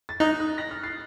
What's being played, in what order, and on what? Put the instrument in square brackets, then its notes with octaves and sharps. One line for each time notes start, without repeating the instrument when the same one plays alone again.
[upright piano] A6
[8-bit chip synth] D#4 [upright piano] D#6 F#6
[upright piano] D#6 F#6
F#6 A#6
F6 A6
A6 C7